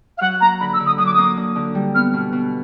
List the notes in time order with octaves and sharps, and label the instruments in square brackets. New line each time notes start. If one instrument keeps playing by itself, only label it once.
[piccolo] F5
[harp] F#3 [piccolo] F#5
[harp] A#3 [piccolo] A#5
[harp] D3 [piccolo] B5
[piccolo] E6
[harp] D3
[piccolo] D#6
[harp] F#3 [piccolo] D#6
[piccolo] D6
[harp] A#3 [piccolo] D#6
[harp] D3
D3
G3
[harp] B3 [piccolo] F6
[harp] B2
B2